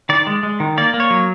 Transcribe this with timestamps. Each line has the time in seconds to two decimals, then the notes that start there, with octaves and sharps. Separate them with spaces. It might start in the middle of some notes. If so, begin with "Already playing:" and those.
0.09 D#3 D5
0.27 G#3
0.43 G#3
0.60 D#3
0.78 A#3 D5
0.94 A#3
1.00 C#5
1.10 F#3